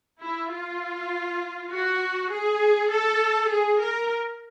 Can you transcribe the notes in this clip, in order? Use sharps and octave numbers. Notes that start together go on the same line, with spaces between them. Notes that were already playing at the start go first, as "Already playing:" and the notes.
E4
F4
F#4
G#4
A4
G#4
A#4